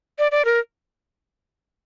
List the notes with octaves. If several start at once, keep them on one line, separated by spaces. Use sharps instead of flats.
D5
D5
A#4